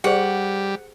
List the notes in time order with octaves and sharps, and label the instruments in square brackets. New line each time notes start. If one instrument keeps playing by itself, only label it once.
[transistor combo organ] G3 [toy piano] G4 G#4 C5 [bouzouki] F#5